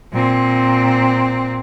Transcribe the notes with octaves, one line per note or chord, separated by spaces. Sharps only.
A#2 C4